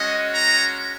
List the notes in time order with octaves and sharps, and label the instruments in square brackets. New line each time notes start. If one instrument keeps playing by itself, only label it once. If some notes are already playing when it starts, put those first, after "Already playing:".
Already playing: [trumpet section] G#3 C#4 F#4 D#5
A#5